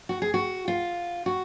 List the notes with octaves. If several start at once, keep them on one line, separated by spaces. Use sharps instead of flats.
F#4
G#4
F#4
F4
F#4